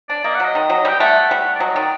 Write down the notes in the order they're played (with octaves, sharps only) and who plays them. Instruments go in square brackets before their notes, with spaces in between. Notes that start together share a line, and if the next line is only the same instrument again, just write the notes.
[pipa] D4 [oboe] D5
[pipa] A#3 [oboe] D#5
[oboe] F#5
[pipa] F#3
[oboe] D#5
[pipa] D#3
F#3
[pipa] G3 [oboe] G5
[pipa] A3 [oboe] F#5
[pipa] G3
[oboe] D5
[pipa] F#3 [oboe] D#5
[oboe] D#5
[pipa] D#3 [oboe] D5